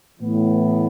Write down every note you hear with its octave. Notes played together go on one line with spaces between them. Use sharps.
A2 E3 B3